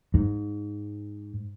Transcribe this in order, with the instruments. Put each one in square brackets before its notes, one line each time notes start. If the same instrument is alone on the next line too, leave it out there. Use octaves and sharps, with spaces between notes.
[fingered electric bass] G#2